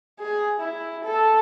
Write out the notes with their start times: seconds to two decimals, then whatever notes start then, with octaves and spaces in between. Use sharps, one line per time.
0.20 G#4
0.60 E4
1.04 A4